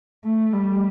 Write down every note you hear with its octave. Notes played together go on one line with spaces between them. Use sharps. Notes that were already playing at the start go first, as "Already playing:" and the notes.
A3
G3